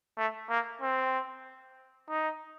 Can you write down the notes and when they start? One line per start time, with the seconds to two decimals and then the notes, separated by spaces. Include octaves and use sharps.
0.17 A3
0.50 A#3
0.81 C4
2.10 D#4